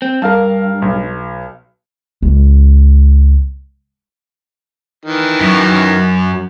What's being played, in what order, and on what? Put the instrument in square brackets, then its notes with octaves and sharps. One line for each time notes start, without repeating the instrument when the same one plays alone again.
[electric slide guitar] C4
[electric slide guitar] G2 [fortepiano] A#4 F5 A5
[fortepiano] B1
[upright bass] C#2 G#3
[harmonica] D#3 E3
[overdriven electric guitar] F#2 F#3